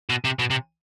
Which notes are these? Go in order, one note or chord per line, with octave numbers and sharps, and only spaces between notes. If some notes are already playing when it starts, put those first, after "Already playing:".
B2
C3
B2
C3